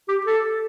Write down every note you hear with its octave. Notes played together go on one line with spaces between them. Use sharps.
G4
A4